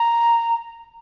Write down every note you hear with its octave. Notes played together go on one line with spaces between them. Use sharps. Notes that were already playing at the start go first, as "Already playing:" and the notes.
Already playing: A#5